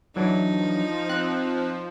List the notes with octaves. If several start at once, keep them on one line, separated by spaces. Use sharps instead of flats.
E3 F#3 D4 D#4
F3
C4 F#6